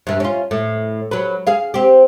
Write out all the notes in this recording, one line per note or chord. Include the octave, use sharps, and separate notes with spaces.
G2 E3
C#4 F4
A2
F#3 B4
G#4 F5
C4 G4